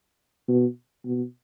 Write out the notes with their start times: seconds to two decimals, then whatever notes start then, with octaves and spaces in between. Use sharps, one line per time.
0.49 B2
1.05 B2